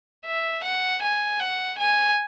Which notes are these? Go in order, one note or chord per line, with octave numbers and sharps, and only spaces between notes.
E5
F#5
G#5
F#5
G#5